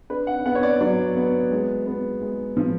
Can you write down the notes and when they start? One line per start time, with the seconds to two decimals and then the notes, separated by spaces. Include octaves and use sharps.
0.10 D4 B4
0.27 F#5
0.46 B3 F#5
0.55 C#5
0.63 D5
0.81 F#3 D5
1.16 B3
1.51 G#3
1.86 B3
2.22 G#3
2.57 F3